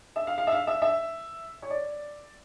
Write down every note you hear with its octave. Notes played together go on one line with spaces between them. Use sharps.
E5
F5
F5
E5
F5
E5
E5
C#5
D5